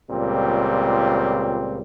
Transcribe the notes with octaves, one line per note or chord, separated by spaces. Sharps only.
C#2 A#2 G3 C4